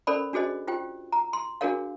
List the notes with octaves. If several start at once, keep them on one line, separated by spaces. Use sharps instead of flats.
C#4 A4 A#4 C5 D5 B5
D4 F#4 G#4 C5 D#5
F4 G4 C5 G5
A#5
C6
D4 F#4 G#4 A#4 C#5 F5